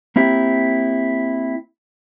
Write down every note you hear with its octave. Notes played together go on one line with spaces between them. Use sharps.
A#3 C4 E4 G4